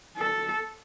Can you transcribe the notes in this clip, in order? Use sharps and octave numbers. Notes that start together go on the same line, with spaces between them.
A4